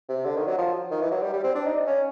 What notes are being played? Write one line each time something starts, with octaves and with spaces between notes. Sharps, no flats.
C3
D3
D#3
F#3
F3
D#3
E3
F#3
G3
G3
C4
D4
D#4
C#4